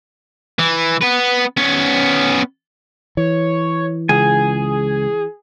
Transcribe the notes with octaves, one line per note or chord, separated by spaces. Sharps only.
E3
B3 B4
B3 C#4
E3 C#5
C#2 G#4 G#5